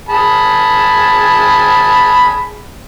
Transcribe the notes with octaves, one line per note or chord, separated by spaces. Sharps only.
G#4 A5 B5